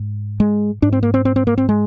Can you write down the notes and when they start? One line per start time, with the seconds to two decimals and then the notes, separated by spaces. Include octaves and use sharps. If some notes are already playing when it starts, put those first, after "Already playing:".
Already playing: G#2
0.40 G#3
0.82 G#2 D4
0.92 C4
1.03 A#3
1.14 C4
1.25 C4
1.36 C4
1.47 A#3
1.58 C4
1.69 G#3